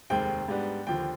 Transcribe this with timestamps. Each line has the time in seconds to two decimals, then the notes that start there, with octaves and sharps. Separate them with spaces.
0.10 F1 D#2 D#3 G#3 C4 G5
0.48 G#2 G3 B3 D4
0.87 D#2 D3 F3 G5